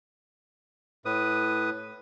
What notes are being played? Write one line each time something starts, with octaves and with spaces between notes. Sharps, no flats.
A2 B4 D#6